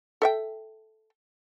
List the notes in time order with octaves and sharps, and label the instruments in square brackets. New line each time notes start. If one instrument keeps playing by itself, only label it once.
[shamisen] A4 E5 G5